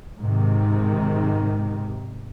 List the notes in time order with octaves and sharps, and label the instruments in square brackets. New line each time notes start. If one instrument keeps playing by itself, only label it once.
[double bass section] G#2 C3 D#3